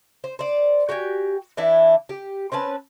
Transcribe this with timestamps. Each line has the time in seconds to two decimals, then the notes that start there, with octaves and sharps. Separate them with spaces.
0.24 C5
0.39 C5 D5
0.89 F#4 G4 G5 G#5
1.57 E3 D4 E4
2.09 G4
2.52 C4 C#4 B4 A5